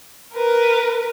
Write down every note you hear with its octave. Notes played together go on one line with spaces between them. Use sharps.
A#4 B4